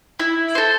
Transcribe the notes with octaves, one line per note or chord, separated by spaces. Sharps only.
E4
A4 C5